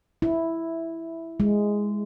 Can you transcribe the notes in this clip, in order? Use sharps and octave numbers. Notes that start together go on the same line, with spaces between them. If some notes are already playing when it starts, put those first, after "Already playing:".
E4
G#3